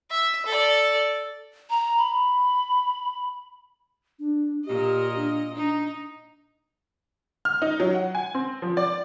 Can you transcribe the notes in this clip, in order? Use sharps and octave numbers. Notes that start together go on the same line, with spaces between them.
E5
A4 D5
A#5
B5
D4
A#2 G4 D#5
D4
D4 D#4
F6
D#4
F#3
F#5
G#5
C4
F3
D5